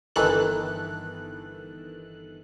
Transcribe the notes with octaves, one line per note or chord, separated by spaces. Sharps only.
G1 D#3 E3 A4 F#6